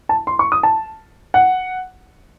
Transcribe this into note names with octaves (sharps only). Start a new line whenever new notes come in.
A5
C6
C#6
D#6
A5
F#5